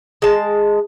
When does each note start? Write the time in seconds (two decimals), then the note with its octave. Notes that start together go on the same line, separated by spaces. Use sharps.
0.22 G#3 A5